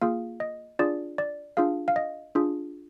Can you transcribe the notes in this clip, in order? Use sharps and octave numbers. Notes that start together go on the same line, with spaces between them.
A#3 F4 G#4 F5
D#5
D4 F4 G#4 D5
D5
D4 F4 G#4 F5
F5
D#5
D4 F4 G#4